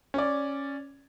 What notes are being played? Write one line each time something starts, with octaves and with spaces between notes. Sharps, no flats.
C#4 D5